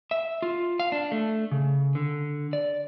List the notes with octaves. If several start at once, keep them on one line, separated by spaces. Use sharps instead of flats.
E5
F4
F5
D4
A3
C#3
D3
D5